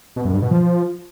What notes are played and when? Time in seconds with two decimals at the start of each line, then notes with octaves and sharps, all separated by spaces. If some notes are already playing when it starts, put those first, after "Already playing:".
0.16 B2
0.25 F#2
0.33 G2
0.42 B2
0.51 F3